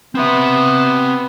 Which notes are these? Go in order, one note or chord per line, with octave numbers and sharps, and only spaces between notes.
B3 C4 E5